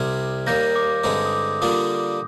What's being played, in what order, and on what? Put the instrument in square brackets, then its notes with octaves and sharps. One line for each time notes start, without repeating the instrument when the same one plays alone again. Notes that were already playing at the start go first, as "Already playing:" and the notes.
Already playing: [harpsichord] C2 C3 G3 C4 [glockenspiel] F6 G#6
[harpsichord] D#2 D#3 G3 A#3 [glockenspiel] G6 A#6
[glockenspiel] D6
[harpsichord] G2 D3 G#3 C4 D#4 [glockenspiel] D6
[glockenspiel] D#6
D6
[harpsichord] D3 G3 A#3 D4 F4 [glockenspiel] D#6